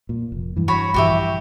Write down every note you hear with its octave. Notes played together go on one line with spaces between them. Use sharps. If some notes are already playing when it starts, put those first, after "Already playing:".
A#2
F1
G2 E3
F#4 C#5 B5
A#1 G2 E3 F#4 G4 E5